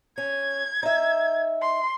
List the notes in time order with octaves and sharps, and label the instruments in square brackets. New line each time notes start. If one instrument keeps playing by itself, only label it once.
[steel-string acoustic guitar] C#4 [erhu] G#6
[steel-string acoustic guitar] D#4 E5
[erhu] C6